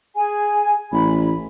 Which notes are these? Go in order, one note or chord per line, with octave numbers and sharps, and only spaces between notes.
G#4 G#5
A1 B5